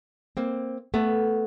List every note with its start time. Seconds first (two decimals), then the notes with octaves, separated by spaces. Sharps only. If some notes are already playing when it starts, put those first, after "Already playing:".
0.37 A#3 C4
0.94 A3 B3